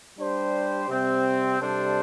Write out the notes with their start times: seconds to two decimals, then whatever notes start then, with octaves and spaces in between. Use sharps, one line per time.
0.17 G3 D4 G4 C5
0.88 C3 G3 C4
1.60 C3 G3 D4 A4 C5